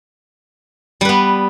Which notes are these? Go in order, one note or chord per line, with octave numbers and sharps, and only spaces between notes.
G3 B3 B4